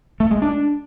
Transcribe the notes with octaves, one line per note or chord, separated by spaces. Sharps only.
A3
G#3
D4